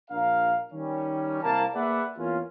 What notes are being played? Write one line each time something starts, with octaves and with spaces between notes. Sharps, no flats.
A#1 D4 A#4 F5
D#3 G3 C#4
C2 A#3 A5
A#3 G#4 B4 D5 E5 F#5
E2 A#3 C#4 F4